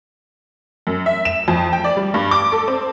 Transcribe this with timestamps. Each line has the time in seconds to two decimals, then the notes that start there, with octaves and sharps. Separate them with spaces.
0.87 F#2
1.06 E5
1.25 E7
1.48 F2
1.73 G5
1.84 D5
1.97 G3
2.14 G2
2.31 D6
2.52 A4
2.68 C4